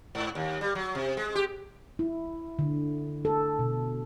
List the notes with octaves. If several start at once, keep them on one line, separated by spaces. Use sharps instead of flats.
G#2
D#2
G3
F#3
C3
G#3
G4
E4
D3
A4
B2